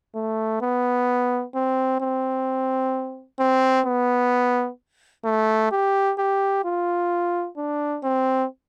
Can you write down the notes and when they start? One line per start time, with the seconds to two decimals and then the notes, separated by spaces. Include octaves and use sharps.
0.15 A3
0.61 B3
1.55 C4
2.01 C4
3.39 C4
3.86 B3
5.25 A3
5.72 G4
6.18 G4
6.65 F4
7.57 D4
8.03 C4